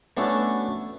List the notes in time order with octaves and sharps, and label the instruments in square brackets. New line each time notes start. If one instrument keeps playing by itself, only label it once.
[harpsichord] A3 D4 A4 [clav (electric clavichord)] B3 C#4 F#4